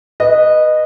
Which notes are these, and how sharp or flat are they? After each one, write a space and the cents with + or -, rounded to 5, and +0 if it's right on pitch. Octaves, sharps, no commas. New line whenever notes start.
B4 -10 D#5 -15